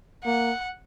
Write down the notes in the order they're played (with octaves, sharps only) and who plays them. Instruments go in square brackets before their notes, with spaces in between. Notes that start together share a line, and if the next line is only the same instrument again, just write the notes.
[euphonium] A#3 [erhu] F#5